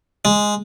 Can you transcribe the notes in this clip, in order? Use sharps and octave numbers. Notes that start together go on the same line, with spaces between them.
G#3